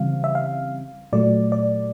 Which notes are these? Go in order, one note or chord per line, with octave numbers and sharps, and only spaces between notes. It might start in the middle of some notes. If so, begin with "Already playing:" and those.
Already playing: C#3 E3 G3 C4 F5
E5
F5
A#2 F#3 A3 D5
D5